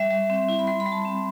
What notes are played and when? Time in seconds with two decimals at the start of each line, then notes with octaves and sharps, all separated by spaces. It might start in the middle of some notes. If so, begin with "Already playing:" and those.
Already playing: G3 E5
0.10 G3
0.30 C4
0.49 E4
0.59 B5
0.67 G3 C6
0.80 B5
0.86 G3
0.92 A5
1.05 C4